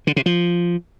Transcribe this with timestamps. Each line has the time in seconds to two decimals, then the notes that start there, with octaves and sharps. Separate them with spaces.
0.07 D3
0.16 C3
0.26 F3